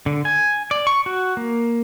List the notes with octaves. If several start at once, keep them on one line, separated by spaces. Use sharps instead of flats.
D3
G#5
D5
C#6
F#4
A#3